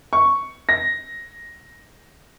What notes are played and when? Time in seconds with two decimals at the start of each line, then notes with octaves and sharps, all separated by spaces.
0.13 C#6
0.69 A#6